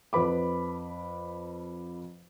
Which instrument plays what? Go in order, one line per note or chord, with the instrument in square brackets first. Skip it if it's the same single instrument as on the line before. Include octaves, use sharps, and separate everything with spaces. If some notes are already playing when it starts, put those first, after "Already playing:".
[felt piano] F2 B4 B5 D6